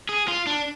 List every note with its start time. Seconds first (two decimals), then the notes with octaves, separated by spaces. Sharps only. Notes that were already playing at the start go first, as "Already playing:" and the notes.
0.09 G#4
0.28 F4
0.47 D4